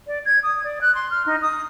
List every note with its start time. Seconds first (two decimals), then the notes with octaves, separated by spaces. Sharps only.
0.07 D5
0.25 G#6
0.43 D#6
0.63 D5
0.81 F#6
0.94 C6
1.10 F6
1.26 D#4
1.42 D#6